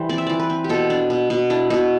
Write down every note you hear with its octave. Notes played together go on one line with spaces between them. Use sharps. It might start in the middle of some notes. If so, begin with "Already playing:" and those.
Already playing: E3 G3 C5
C4 D5
E5
E3 D5
B4
C4
G4
B2 A4
D4
B2
B2 F#4
D4 E4
B2 F#4